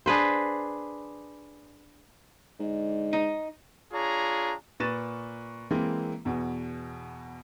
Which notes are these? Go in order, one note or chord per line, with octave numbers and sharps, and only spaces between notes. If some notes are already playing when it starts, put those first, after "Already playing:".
D4 G#4 B4 C5
G#2 D3 D5 D#5
D#4
D4 F4 G#4 C#5 A#5
A#2 B4 C#6 A6 D#7 E7
E3 G#3 A#3 C4
E2 B2